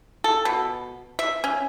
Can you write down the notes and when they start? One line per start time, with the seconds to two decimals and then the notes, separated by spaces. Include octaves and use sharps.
0.24 A4
0.45 B2
1.19 E5
1.44 C#4